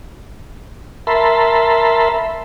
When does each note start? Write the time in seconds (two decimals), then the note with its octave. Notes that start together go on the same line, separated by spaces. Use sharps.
1.07 A#4 E5 A5 B5 C6